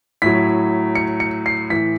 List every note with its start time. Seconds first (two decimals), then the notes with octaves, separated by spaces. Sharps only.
0.22 A2 F#3 B6
0.95 C#7
1.20 C#7
1.46 C7
1.70 A2 E3 B6